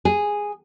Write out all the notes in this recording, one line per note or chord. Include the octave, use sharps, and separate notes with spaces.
G#4